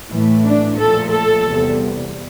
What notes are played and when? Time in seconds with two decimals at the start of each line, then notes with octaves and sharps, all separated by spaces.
0.11 A2 E3 A3
0.45 D4
0.78 A#2 F3 A3 A4
1.12 A4
1.46 E2 C3 G3